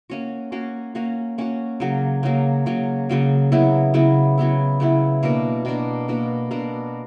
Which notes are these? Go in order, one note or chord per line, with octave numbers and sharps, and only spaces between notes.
A#3 C#4 F#4
A#3 C#4 F#4
A#3 C#4 F#4
A#3 C#4 F#4
C#3 F#3 A#3
C#3 F#3 A#3
C#3 F#3 A#3
C#3 F#3 A#3
C#3 F#3 B3 E4
C#3 F#3 B3 E4
C#3 F#3 B3 E4
C#3 F#3 B3 E4
B2 A#3 D4 A#4
B2 A#3 D4 A#4
B2 A#3 D4 A#4
B2 A#3 D4 A#4